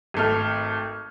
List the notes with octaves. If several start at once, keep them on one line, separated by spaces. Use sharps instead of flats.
G#1 A3 F6